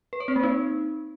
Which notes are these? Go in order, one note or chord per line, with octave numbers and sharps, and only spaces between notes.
B4
C#5
C4
A#3
D#4